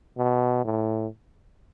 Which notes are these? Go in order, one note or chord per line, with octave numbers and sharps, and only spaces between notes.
B2
A2